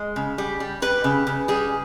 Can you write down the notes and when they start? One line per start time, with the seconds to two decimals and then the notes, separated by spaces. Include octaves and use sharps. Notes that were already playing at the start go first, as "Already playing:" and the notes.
Already playing: G#3
0.16 C#3
0.38 G3
0.60 G3
0.82 G3 B4
1.04 C#3
1.27 C#3
1.48 G3 G#4